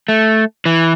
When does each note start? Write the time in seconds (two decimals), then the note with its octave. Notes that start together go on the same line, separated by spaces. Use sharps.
0.09 A3
0.65 E3